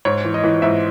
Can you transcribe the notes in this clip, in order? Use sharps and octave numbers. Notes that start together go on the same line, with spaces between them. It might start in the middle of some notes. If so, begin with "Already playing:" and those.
G#2 C#5
E3
D#5
E3
G#2 E5